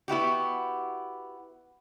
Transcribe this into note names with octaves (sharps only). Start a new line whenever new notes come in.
B3 E4 F#4 G4